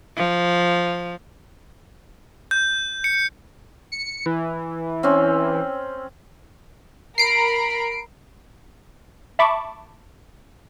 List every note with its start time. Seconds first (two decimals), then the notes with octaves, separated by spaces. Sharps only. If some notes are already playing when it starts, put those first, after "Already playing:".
0.16 F3
2.51 G6
3.04 C#7
3.92 C#7
4.26 E3
5.03 C4 C#4
7.18 A#4 A#5 B5 C7 D7
9.39 E5 A5 B5 C#6 D6